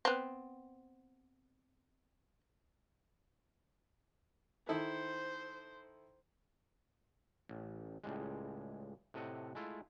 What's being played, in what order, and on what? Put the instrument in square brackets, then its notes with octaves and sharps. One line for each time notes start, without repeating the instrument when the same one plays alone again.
[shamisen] B3 C4
[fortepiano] D#3 E4 A4 [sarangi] C5
[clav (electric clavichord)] A1
C#2 A2 G3 G#3
A2 C3 A3 D#5 F#5
G#3 A3 E4 F4